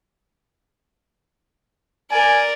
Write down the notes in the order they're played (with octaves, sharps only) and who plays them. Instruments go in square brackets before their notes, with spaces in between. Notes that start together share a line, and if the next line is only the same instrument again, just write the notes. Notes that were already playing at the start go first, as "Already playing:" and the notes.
[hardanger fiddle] A#4 D5 [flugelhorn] G#5